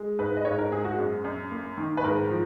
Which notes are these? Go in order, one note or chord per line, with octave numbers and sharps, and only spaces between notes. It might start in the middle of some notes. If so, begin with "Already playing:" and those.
Already playing: G#3
G#2 B4
D#5
G#2 C#5
A#4
G#3 G#4
F#4
F#2
F#2
A#3
D#3
B4
G#2 A#4
F3